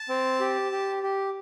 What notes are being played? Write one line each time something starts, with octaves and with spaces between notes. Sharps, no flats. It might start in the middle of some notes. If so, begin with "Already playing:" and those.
Already playing: A5
C4
G4
G4
G4